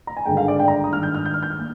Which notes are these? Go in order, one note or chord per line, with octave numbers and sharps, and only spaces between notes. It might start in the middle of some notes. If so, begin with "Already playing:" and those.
A#5
G#5
G#1 G2 D3 G#3 D4 G5
F5
D5
G5
A#5
D#6
G#1 G2 D#3 F6
G6
F6
G6
F6
G6
F6
A#3